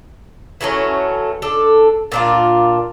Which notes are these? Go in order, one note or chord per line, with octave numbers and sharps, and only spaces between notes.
E3 F#3 A3 C#4
D4 A4
A#2 D4 F4